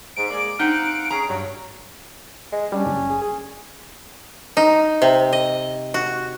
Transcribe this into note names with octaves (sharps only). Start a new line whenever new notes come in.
G#2 D7
G#3 A#3 D5
C4 D#4 F5 F#5 B6
C#4 G#4 A#5
G2 F#3 C#4
G#3
G3 C#4 D4
F#1
G#4
G#4
D#4
C3
D#5
F#4